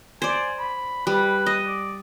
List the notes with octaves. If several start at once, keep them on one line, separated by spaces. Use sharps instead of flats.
C5 D5 G#5
B5
G3 B4
D#5
D5